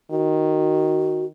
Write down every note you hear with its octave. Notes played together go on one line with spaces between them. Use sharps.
D#3 F#4